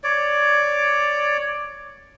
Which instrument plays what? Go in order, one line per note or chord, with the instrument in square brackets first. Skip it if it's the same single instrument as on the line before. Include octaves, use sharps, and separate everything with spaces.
[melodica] C#5 D5